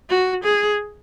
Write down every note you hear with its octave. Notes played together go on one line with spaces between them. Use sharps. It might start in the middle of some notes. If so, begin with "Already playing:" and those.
F#4
G#4